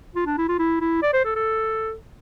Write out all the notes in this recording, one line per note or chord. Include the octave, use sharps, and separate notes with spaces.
F4
D4
E4
F4
E4
E4
D5
C5
A4
A4